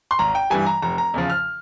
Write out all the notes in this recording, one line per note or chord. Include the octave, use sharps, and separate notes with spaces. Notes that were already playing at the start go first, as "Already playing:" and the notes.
C6
G#1 A#5
G5
G2 E3 G3 G#5
A#5
F1 A#5
A#5
E2 C#3 F3
F6